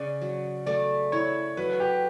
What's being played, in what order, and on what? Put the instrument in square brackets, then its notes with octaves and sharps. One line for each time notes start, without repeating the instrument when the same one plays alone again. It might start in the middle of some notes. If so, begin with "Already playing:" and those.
Already playing: [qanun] C#3 [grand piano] D5
[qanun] F#3
[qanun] A3 [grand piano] D5
[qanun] E4 [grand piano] C#5
[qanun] F#3 [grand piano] B4
[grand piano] G4